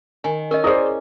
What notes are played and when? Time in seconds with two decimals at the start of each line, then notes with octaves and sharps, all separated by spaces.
0.24 D#3 G#5
0.51 C#4 A#4 D#5 G#5
0.64 E4 G#4 C5 D5 D#6